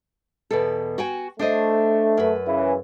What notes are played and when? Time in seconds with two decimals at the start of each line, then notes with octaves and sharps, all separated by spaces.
0.51 E2 B2 A4
0.98 F#4 G5 G#5
1.39 A3 D4 C5 D#5
2.17 F#2 B4
2.47 C#3 E3